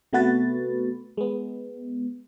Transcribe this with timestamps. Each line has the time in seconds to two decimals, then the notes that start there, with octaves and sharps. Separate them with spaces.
0.13 C3 A3 B3 F#4 B4 A6
1.17 G#3 B3